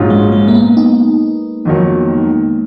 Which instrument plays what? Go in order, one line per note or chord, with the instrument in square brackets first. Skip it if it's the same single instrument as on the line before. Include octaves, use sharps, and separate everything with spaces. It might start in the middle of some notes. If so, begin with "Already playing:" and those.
Already playing: [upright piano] A#1 G#2 F#3 C#4 F4
[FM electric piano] G#3
G#3
A#3
B3
D#4
[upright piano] F2 D#3 F#3